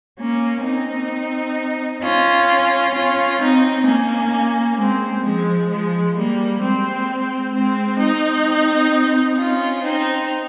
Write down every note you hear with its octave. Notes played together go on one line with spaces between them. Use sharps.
A#3 C#4
C4 D#4
C#4 F4
C#4 F4
C4 D#4
A#3 C#4
G#3 C4
F3 G#3
F3 G#3
G3 A#3
G#3 C4
G#3 C4
C4 D#4
C#4 F4
C4 D#4